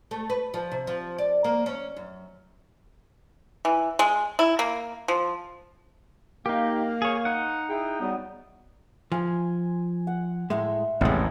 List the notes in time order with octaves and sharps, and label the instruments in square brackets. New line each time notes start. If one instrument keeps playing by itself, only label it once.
[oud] A3
B4
F3
C3
F3
D5
A#3
C#4
F#2
[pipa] E3
G#3
E4
A#3
F3
[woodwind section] A#3 F5 [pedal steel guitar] D#4 G4
[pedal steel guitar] G#4 C#5
D#4 F#5
[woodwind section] E4 G#4 G5
F#3 G3 B3
[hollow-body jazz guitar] F3 [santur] G#5 C6
[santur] F#5
[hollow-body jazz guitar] A2 G#3 [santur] E5 C6
[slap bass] A1 E2 G#2 [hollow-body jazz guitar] C3 G#3 [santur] F#5